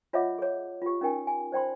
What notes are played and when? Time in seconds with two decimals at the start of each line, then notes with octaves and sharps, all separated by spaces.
0.13 F4 C#5 D#5 E5 F#5 D6
0.38 G#4 C#5
0.82 F4 G4
1.01 C#4 D#4 A#4 G5 G#5
1.27 G#5
1.52 C5 D5 G5 B5 C6